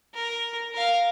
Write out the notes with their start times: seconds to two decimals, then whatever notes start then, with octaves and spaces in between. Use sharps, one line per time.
0.14 A#4
0.74 A#4 F5